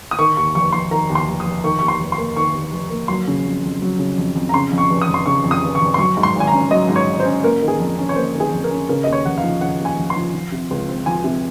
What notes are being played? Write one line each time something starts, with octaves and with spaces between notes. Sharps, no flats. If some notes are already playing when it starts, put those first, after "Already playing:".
D#6
D#3 C#6
D#2 C#6
F1 C#6
F1 C6
D#3 A#5
D#2
C6
F1
D#6
F1
D#3 C#6
D#2 C#6
C6
F1
C6
A#3
D#3 C#6
D#2
F1
A#3
F#3 C6
C#3
F2
F2
F#3
C#3
F2
F2
A#5
C#3 C6
F2
C#6
F1
D#6
F1
C6
C#3 C#6
F2
D#6
F1
C#6
F1
C6
F#3 C#6
G#2
C6
G#1
G#5
A#5
C#4
F#3 D#5
G#2
C#5
G#1
C5
C#4
A#3 A#4
D#3
G#4
F2
C#4
C#5
A#3 C5
D#3
G#4
F2
A#4
C#4
C#3 A#4
D#2 D#5
C#5
F1 F#5
F5
F3
C#3 F#5
D#2
G#5
F1
C6
F3
F3
C3
C#2
C4
F3 G#5
C3